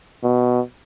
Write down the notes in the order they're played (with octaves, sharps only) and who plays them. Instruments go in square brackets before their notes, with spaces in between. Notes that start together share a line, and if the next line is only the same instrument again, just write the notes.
[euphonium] B2